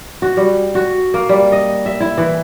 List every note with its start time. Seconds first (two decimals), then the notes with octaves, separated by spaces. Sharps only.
0.22 F#4
0.37 G3
0.75 F#4
1.14 A#3
1.29 G3
1.52 D#5
1.86 E5
2.00 E4
2.18 E3